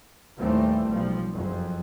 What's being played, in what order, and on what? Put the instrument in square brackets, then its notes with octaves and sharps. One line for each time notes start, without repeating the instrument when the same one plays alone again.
[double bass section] D#2 A2 E3 G3 A3 C4
B1 F3 G3
F#1 F2